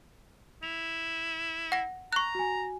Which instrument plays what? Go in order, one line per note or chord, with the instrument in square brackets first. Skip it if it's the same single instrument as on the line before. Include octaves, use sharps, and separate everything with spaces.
[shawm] E4 [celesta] F7
[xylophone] F#5 A#6
[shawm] A#5 [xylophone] C#6 F#6
[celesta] F#4 G#5